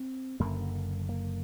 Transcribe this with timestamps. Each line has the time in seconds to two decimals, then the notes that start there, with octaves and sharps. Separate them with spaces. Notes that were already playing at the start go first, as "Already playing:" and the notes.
Already playing: C4
0.40 F#1 F#2 D3 A#3
1.09 A#3